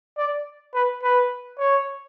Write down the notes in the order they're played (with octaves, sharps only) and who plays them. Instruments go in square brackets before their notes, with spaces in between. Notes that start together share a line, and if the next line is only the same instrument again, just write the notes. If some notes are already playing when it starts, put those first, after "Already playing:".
[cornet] D5
B4
B4
C#5